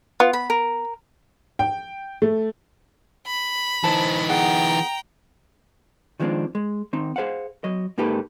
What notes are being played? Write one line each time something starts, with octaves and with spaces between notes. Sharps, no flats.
B3 F4
B5
A#4
G5
A3
B5
E3 D#4 C5 A5
B3 G#4 F#5 G5 A#5
D#3 F3 G#3 B3 C4 D4
G#3
D#3 C4 D#4
G#4 C5 F5 F#5
F#3 D#5
G#2 A#3 D#4 G4 A4 B4